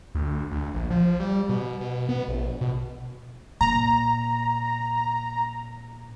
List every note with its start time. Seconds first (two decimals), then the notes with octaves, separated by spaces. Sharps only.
0.15 D2
0.51 D2
0.74 A#1
0.90 F3
1.20 G3
1.49 B2
1.81 B2
2.09 B3
2.28 A#1
2.61 B2
3.61 A#2 A#5